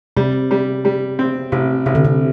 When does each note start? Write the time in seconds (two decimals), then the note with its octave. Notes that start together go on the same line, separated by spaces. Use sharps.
0.16 C3 G3
0.51 G3
0.85 G3
1.19 C4
1.52 A1 C3
1.86 A1 C3
1.95 D3
2.05 C3